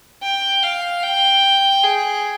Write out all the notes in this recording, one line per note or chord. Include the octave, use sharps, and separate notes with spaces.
G5
F5
G5
G#4